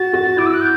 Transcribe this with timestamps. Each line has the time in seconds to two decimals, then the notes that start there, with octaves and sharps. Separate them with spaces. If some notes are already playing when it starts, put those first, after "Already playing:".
Already playing: F#4 A6
0.13 F#4
0.37 E4 D6
0.46 E6
0.53 F#6
0.61 G6